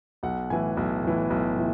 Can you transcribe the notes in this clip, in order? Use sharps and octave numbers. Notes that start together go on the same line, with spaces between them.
B1 F#5
A2 E3 G#5
B1
A2 E3
B1
A2 E3